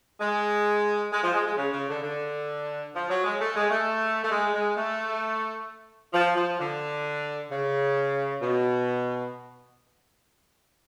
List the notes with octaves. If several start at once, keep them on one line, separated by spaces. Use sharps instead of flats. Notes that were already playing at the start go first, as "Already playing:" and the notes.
G#3
G#3
F3
G#3
G#3
C#3
C#3
D3
D3
F3
F#3
G#3
A3
G#3
A3
A3
G#3
G#3
A3
F3
F3
D3
C#3
B2